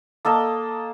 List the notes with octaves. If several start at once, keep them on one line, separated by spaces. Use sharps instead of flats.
A#3 A4 D#5 A5